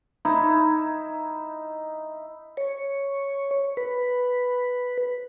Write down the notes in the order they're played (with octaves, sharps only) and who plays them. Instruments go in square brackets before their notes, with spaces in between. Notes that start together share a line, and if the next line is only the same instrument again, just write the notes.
[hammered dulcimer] D#4 E4
[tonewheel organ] C#5
B4